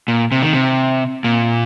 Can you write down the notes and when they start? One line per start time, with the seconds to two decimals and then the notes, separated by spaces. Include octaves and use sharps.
0.08 A#2
0.32 C3
0.42 D#3
0.53 C3
1.24 A#2